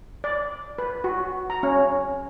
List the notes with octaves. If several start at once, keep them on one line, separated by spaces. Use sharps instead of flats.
D5
B4
F#4
A#5
C#4